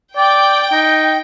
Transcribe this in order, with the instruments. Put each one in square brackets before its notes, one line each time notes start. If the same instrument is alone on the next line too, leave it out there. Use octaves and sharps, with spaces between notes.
[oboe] D5 [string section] G5
[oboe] D#4